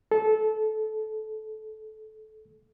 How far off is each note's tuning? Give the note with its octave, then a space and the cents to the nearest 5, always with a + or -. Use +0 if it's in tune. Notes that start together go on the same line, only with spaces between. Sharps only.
A4 -20